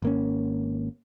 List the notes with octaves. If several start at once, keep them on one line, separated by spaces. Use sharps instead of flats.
G#1 A#3 C#4